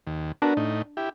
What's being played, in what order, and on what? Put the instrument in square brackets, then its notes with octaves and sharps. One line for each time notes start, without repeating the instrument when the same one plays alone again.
[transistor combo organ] D#2
[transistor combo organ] B3 F#4 A#4 [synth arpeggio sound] D4
[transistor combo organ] A2 D#4
E4 G4